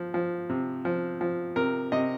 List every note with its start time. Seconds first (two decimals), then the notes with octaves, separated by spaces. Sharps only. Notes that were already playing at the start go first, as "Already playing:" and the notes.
Already playing: F3
0.14 F3
0.49 C3
0.85 F3
1.21 F3
1.56 C3 A#4
1.92 C3 D#5